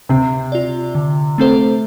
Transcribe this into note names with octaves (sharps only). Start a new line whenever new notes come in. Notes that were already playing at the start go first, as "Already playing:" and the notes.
C3 C4
F4 D5
D3
A3 C4 A4 C5